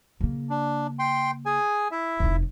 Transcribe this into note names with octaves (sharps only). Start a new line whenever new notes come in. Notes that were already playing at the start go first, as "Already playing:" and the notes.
C#3 A#3
D4
G5 C6
G#4 G#5
E4 E5
F1 D#4